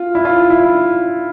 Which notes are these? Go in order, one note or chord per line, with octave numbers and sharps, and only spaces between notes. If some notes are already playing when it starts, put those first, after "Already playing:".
Already playing: F4
E4
F4
E4